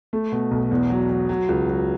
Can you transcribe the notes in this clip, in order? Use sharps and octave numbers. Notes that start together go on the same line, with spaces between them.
A3
B2
B1
E2
F#3
F#3
F#3
C#2
F#3